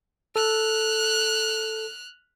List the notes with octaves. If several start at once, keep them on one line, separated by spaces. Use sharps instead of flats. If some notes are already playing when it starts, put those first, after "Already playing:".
A4 F6 F#6